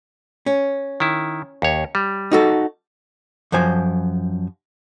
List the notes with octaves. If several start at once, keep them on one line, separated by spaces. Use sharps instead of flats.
C#4
D#3 E4
D#2 C#5
G3
D#4 F#4 A4
F#2 F3 C5 G#5